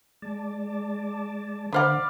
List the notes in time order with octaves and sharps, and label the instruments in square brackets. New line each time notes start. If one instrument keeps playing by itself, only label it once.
[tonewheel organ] G#3 D5 A5
[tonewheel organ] D3 [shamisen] D4 C5 F#5 [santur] D5 F5 B5